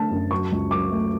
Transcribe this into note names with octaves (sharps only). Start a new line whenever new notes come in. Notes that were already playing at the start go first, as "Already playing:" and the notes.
Already playing: D3 A3 A5
F#2
F#3 C#6
C#2
F#3 D6
A3